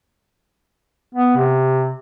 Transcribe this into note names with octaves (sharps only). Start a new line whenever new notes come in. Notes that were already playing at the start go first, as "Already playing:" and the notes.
B3
C3